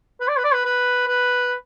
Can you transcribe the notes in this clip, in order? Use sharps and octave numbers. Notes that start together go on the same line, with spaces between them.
B4
D5
B4
D5
B4
B4
B4